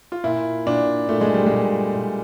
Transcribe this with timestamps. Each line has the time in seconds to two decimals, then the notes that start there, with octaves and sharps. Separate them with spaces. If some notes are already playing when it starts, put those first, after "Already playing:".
0.12 F4
0.24 A#2 E4
0.66 A#2 D4
1.09 A#2 A3
1.21 G#3
1.34 G3
1.46 G#3
1.51 A#2
1.94 A#2